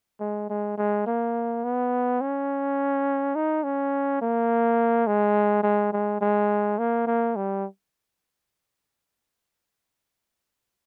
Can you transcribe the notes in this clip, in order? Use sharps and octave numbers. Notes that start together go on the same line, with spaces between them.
G#3
G#3
G#3
A#3
B3
C#4
D#4
C#4
A#3
G#3
G#3
G#3
G#3
A#3
A#3
G3